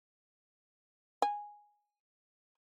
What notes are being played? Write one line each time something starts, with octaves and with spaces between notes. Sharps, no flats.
G#5